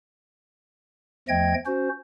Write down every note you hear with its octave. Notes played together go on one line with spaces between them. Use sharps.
E2 F3 A3 D#5 G5 G#6
C#4 F#4 C5